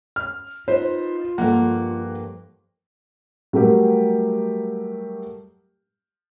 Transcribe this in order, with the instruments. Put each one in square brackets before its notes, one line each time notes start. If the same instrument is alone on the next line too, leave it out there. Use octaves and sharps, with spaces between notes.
[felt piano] F6
[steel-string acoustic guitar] D#4 B4 [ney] F4 [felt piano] C5
[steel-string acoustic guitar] G2 F3 A#3 [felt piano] A4 F#5
[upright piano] F#3 G3 A3 F#4 G4 A#4